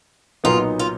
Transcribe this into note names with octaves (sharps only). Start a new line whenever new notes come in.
B1 A#2 F#3 B3 D#4 F4
F4